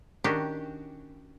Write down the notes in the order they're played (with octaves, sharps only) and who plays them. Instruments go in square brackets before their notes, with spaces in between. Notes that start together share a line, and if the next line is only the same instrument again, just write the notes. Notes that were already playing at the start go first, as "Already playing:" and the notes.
[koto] D#3 C#4 D4 F#4 G4